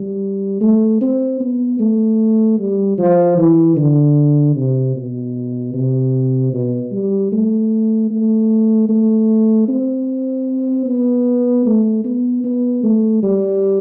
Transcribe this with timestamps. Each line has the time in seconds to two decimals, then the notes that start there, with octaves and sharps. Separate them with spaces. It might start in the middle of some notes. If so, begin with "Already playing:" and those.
Already playing: G3
0.61 A3
1.01 C4
1.40 B3
1.79 A3
2.59 G3
2.98 F3
3.37 E3
3.76 D3
4.55 C3
4.95 B2
5.73 C3
6.53 B2
6.92 G3
7.32 A3
8.10 A3
8.89 A3
9.68 C4
10.86 B3
11.66 A3
12.04 B3
12.44 B3
12.83 A3
13.23 G3